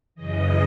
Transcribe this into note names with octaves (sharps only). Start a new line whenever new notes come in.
F#2 C#3 E3 D#5